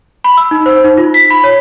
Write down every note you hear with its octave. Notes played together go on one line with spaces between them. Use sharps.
B5
E6
D#4
C5
D#4
F4
B6
B5
C#5